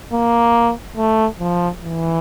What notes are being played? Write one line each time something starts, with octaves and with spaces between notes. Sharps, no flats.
A#3
A3
F3
E3